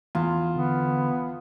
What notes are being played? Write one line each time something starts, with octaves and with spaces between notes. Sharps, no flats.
E2 F4
D3 B3